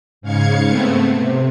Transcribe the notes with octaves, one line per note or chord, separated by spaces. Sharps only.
G#2 C#3 F5 G#6 C#7
A3 B3 C4
C3